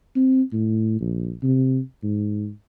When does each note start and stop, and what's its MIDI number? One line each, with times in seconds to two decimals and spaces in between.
0.16 0.42 60
0.53 0.98 45
1.00 1.32 34
1.43 1.80 48
2.03 2.50 44